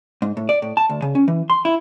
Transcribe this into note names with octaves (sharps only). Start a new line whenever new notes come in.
G#2
A2
D5
A2
A5
D2
C#3
C#4
E3
C6
E4